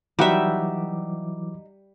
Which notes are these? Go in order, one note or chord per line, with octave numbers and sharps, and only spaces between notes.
E3 F#3 G3 D#4 F#4 E5 F#5 D6